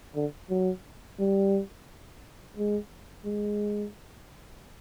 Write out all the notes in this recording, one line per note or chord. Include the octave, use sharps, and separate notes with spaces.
D3
F#3
G3
G#3
G#3